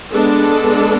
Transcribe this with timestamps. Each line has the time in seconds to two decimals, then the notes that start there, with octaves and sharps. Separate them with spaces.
0.11 G#3 B3 D4 A4